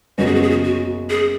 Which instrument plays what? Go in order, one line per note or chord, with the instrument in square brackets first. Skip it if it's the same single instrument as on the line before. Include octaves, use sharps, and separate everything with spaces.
[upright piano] F#1 F#2 C#3 G#3 B3 [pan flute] F#4
[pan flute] G#4
F#4
G#4
F#4
F#4
G#4